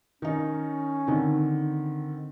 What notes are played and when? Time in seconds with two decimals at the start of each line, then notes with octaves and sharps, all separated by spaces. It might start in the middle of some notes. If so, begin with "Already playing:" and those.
0.22 D#3 C#4 D#4
1.07 D3 D#3 C4